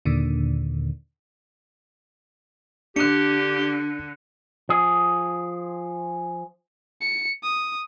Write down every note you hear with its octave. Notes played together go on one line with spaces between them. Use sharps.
D#2 A#2 D3
D3 D4 G4 F#6 C#7
F3 G#4
C#7
D#6